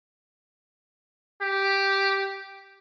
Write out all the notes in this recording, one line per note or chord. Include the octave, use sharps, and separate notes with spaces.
G4